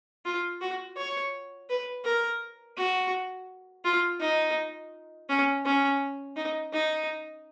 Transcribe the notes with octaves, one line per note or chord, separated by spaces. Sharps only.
F4
F#4
C#5
B4
A#4
F#4
F4
D#4
C#4
C#4
D#4
D#4